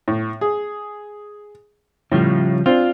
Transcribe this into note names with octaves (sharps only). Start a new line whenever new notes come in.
A2
G#4
A2 C#3 F3 G3
C4 D4 F4